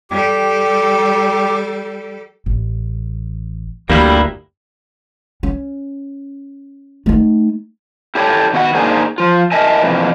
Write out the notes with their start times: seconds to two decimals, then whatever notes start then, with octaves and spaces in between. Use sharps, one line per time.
0.10 G3 G4 A4
2.46 A1
3.90 G1 D2 G3 A#3 E4
5.43 C#4
7.06 A3 D#4
8.15 E4 G4 A4 C#5
8.53 D#3 B3 F#4 D#5 F#5
8.75 A#3 D4 D#4 G#4 C5 G#5
9.18 F3 F4
9.52 E4 A#4 D#5 E5 G#5 A5
9.82 F2 G#2 C3 E3